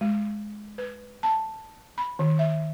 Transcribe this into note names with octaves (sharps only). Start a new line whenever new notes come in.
G#3
B4
A5
B5
D#3
E5